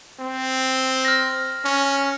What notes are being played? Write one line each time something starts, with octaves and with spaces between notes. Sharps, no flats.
C4
F6 A#6
C#4